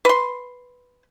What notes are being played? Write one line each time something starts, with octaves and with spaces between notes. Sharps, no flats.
B4 C6